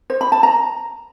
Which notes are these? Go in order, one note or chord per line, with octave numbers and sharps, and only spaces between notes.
C5
B5
A5
A#5